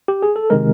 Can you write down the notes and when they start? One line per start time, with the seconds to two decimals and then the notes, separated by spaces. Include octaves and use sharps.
0.08 G4
0.23 G#4
0.36 A4
0.50 C3 D#3 G#3 A#4